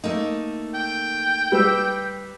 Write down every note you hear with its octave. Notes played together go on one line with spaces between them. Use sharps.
A3 A#3 D#4
G5
G3 B4 E6